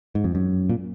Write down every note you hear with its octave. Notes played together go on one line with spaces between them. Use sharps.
G#2
F2
F#2
A#2